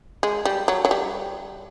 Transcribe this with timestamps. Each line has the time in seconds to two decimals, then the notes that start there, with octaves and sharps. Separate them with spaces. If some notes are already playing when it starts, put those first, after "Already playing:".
0.23 G#3
0.45 G3
0.68 F#3
0.85 F#3
0.91 G3